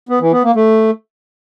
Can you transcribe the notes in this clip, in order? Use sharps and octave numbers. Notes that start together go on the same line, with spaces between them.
B3
E3
B3
A#3
A3